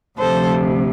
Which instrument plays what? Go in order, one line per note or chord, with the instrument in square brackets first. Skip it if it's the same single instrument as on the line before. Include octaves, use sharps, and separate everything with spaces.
[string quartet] D2 C3 F3 A4 C5